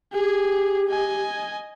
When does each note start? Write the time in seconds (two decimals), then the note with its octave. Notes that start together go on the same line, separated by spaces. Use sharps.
0.13 G4 G#4
0.90 D#5 G#5